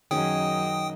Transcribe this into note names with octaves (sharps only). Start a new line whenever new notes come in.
F#2 D#3 C#4 G#4 D#5 G5 D#6